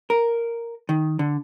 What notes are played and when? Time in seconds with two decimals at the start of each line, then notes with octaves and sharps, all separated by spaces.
0.10 A#4
0.89 D#3
1.19 D3